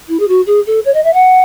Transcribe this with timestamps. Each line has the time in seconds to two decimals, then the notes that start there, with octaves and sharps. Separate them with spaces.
0.08 E4
0.19 G#4
0.28 F#4
0.46 G#4
0.66 A4
0.85 C#5
0.94 D#5
1.04 E5
1.13 F#5